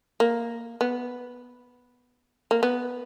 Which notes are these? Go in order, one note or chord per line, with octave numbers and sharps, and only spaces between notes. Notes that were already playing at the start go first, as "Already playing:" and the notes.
A#3
B3
A#3
B3